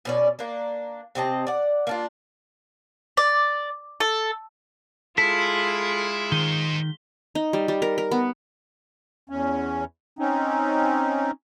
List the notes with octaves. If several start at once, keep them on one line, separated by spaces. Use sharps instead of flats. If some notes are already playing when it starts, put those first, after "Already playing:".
B2 C#4 D5
A#3 D4
C3 C4 D#5 A5
D5 F#5
A#3 D4 F4
D5
A4
G#3 E4 F4 A4 B6
D#3 D#4 C5 G7
D#4
G3
G3
A#4
A#4
B3
E2 C#4
C4 C#4 D#4